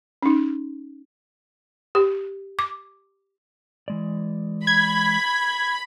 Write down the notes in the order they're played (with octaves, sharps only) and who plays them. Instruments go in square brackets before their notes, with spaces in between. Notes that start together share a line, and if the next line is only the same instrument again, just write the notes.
[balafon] C#4 D#4
G4
D6
[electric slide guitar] E3 G#3 D5
[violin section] B5 [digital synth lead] G#6